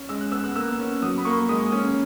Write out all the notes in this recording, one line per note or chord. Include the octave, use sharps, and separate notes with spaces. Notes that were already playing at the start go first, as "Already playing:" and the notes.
Already playing: C#4
G#3 E6
F#6
B3 E6
F#6
A#3 E6
C#4
F#3 D#6
B5
A#3 C#6
G#3 D#6
C#4